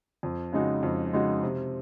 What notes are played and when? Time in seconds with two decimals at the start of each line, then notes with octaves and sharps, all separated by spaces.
0.23 F2
0.52 C#3 G#3 D#4 F#4
0.83 F2
1.13 C#3 G#3 D#4 F#4
1.43 C3